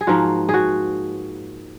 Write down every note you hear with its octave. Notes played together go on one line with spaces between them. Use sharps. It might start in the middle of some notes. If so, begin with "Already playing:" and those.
G#4
G#2 F3 A#3 F4 F#4
G#4
F#4